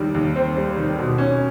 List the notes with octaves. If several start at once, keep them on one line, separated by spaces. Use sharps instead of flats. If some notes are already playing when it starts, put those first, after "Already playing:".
Already playing: D#2 D#3 G3
D#2
C4
G3
D#3
B2
C#4